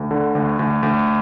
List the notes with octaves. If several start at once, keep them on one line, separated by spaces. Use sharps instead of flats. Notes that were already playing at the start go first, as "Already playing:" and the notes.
Already playing: D2
D3
D2
D2
D2